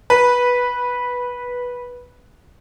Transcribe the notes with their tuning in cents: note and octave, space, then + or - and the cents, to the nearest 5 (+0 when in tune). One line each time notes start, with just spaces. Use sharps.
B4 -10